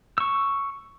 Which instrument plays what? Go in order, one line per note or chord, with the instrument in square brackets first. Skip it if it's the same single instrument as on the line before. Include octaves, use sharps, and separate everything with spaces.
[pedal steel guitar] C#6 E6